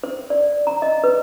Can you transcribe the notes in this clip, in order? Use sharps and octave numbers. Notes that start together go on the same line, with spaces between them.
C5
D5
A#5
D#5
B4